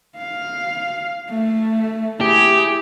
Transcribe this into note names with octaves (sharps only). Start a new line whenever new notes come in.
F5
A3
E4 G4 G#4